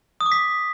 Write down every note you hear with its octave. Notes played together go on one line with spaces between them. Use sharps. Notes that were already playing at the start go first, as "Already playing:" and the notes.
D#6
D6
B6